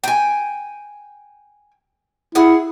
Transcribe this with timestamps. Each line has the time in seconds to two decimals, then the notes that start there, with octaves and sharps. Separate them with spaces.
0.04 G5 G#5
2.35 E4 G#4 F#5